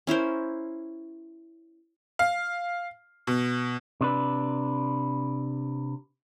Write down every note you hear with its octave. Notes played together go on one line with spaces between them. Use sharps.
C#4 E4 A#4 C5
F5
B2
C3 D4 B4